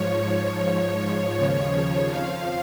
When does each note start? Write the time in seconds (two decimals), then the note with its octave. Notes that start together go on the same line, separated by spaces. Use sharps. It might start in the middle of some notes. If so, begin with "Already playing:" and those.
Already playing: G#2 F3 C#5
0.64 G#2 F3
1.36 D#2 C#3 F3
2.08 F2 F3 F5